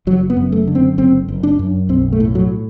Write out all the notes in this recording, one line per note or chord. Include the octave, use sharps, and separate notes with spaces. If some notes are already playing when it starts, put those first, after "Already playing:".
F#1 F#3
B3
F#2
A3
D3
C4
F#1 C4
F#1
D4
F#2
B1 C4
A3
A2
F#3